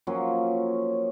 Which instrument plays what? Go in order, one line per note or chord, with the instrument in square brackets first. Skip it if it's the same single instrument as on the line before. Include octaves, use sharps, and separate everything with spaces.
[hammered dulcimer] F3 F#3 A#3 C#4